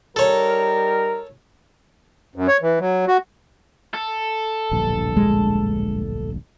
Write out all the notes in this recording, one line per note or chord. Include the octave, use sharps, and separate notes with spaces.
G3 D#4 A4 A#4 C#5
F#2
C#5
E3
F#3
F#4
A4
D1 A#1 G2
G#3